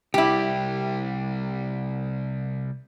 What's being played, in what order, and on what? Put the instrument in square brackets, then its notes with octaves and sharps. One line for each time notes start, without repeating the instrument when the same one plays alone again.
[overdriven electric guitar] C2 G3 [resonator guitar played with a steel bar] E4 G4